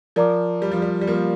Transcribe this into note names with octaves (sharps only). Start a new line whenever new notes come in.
F3 A#4 D5 A#5 D6
G3
F3
G3
G3
F3 A#3